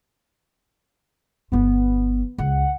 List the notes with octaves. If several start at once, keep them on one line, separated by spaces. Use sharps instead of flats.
G1 F3 B3
C#2 F#5